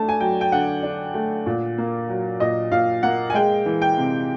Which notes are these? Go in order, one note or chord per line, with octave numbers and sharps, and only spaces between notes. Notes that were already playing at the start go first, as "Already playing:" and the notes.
Already playing: A3 D4 A5
G#5
F#3 G5
G5
D3 F#5
D4
A3
A#2
A#3
F#3
A#2 D#5
A#2 F5
A#3 F#5
G#5
G#3 G5
E3
G5
C3